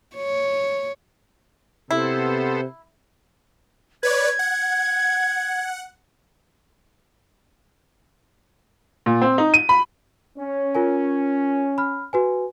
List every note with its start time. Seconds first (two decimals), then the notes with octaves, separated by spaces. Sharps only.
0.15 C#5
1.91 C3 B3 E4 A4 C5
4.03 B4 C#5 D5 G#6
4.39 F#5
9.06 A#2
9.22 C4
9.38 D#4
9.54 D#7
9.69 B5
10.38 C#4
10.75 F4 A#4 G#5
11.78 B5 F6
12.13 F#4 B4 G#5